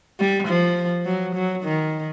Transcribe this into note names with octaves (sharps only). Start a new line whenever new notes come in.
G3
F3
F#3
F#3
D#3